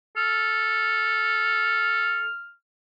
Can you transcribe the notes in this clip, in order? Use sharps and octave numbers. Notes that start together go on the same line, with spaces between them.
A4 F6